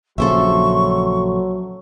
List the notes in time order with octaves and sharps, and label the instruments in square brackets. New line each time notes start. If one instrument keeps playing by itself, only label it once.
[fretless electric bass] A#1 C#3 [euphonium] F#3 [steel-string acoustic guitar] A4 C5 E5 [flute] C#6